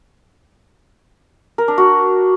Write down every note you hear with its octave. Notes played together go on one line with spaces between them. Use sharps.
A#4
D4
F#4